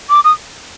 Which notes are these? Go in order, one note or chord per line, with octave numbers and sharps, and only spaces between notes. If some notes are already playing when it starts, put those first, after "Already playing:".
D6
D#6